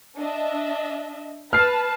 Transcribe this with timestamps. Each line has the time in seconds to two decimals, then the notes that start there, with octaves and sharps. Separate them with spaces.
0.17 D4 D#5 E5
1.53 B4 A5 F6 C7